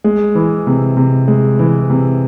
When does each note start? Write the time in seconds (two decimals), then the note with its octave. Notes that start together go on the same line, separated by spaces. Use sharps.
0.04 G#3
0.35 E3
0.67 C3
0.97 C3
1.28 G#3
1.59 E3
1.90 C3